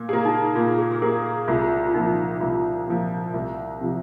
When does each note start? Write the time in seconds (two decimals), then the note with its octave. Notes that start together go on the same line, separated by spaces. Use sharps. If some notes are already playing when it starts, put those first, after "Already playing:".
Already playing: A#2
0.09 A#3 G#4
0.25 D#4
0.55 A#2 F4
0.78 G#4
0.91 G#4
1.02 A#3 G#4 A#4
1.26 G#4
1.48 C2 F4
1.87 F4
1.94 A#2 F3 D#4
2.41 C2 F4
2.88 A#2 F3
3.34 C2
3.81 C3 F3